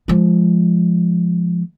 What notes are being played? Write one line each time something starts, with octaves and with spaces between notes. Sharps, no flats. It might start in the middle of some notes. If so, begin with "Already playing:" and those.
F3 G#3